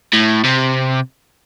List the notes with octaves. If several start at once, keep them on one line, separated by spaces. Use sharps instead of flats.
A2
C3